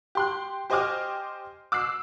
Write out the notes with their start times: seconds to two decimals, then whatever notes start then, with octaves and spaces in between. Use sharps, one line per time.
0.15 G4 C6 F#6
0.70 G4 C5 D#5 G#5 D6 F6
1.72 D6 E6 F#6 C7